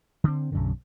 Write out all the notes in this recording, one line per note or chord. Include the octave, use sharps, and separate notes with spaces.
D3 C4
B1 F#2 D3